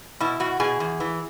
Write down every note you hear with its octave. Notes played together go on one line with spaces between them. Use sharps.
B2 E4
B2 F#4
B2 G#4
E2
E3